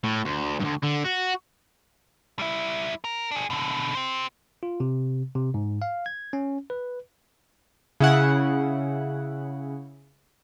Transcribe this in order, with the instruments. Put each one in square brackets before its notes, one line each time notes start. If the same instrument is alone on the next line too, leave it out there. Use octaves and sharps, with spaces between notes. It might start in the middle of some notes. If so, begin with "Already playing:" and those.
[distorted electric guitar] A2
D2
D2 G2
D3
F#4
[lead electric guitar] G3 E4
A#4
D4 G#4
B2 D3
G4 C5
[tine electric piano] F4
C3
C3
G#2
F5
G#6
C#4
B4
[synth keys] C#3 E4 F#5